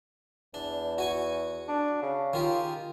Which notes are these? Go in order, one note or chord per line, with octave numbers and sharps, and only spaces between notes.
E2 D4
F#4 G#5 C#6
D4
C#3
D#3 F4 G4